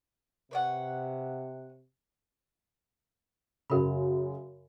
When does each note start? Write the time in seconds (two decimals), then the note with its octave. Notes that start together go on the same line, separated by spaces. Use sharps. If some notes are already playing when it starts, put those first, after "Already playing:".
0.51 C3 B4 C#5 F#5
3.70 F#2 C#3 A#4 B5